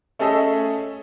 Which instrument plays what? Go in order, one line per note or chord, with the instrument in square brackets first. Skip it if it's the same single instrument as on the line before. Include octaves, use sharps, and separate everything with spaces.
[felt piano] A3 C#4 G#4 A4 D#5 E5